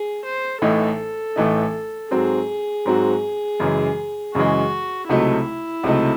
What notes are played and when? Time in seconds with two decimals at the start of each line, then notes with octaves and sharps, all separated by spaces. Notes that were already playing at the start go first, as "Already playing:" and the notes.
Already playing: G#4
0.25 C5
0.62 A1 A2 E3 A3 D#4 A4
1.36 A1 A2 E3 A3 D#4
2.11 G#2 F#3 C4 F#4 G#4
2.86 G#2 F#3 C4 F#4
3.60 F#2 C#3 E3 G#3
4.35 F#2 C#3 E3 G#3 F#4
5.09 C#2 C3 F#3 A3 D#4 E4
5.83 C#2 C3 F#3 A3 D#4